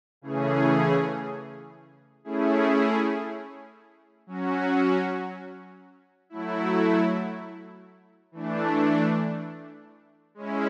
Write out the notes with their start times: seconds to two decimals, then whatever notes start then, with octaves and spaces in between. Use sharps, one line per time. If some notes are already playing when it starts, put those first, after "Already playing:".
0.22 C#3 E3 A3 C#4 G#4
2.24 A3 C#4 E4 G#4
4.27 F#3 C#4 F#4
6.30 F#3 A3 E4
8.32 E3 A3 D4
10.35 G#3 C#4 E4